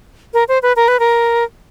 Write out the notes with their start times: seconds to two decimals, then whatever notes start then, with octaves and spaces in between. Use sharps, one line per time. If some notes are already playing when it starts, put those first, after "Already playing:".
0.34 A#4
0.48 C5
0.63 B4
0.76 A#4
0.88 B4
0.99 A#4